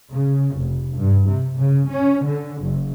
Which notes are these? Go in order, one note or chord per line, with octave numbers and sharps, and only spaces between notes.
C#3
F1
G2
C3
C#3
C#4
D3
F#1